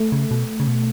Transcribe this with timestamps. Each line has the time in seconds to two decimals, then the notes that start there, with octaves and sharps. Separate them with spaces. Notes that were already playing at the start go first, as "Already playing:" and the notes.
Already playing: A3
0.12 C#3
0.31 B2
0.60 C#3
0.67 B2